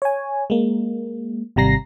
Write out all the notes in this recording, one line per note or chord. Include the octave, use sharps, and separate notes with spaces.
C#5 G#5
G#3 A#3
G#1 C3 G3 A#5 A#6 C7